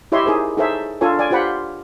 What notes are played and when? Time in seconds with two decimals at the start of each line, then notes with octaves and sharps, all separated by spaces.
0.12 E4 G4 C#5 D#5 E5 C6
0.26 D#4 G#4 A#4 C5
0.57 D#4 G#4 A4 C5 C#5 E5
1.01 D4 F4 A4 C#5 G#5
1.19 D5 G#5
1.31 F4 G4 C5 F#5 B5